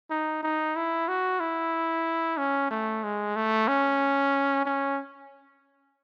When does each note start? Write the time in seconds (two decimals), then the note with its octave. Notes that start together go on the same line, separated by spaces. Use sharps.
0.11 D#4
0.43 D#4
0.76 E4
1.08 F#4
1.40 E4
2.38 C#4
2.71 A3
3.04 G#3
3.36 A3
3.68 C#4
4.65 C#4